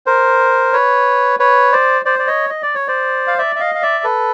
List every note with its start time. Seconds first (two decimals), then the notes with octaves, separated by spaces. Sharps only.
0.06 A#4 C5
0.73 B4 C#5
1.40 B4 C#5
1.72 C5 D5
2.05 C5 D5
2.19 D5
2.27 C#5 D#5
2.50 D#5
2.63 D5
2.75 C#5
2.88 C5 D5
3.27 F5
3.38 D5 E5
3.56 E5
3.60 D#5 F5
3.75 F5
3.82 D5 E5
4.04 A4 B4